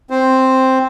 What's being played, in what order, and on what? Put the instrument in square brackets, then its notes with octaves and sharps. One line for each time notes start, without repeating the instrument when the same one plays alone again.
[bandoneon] C4 C5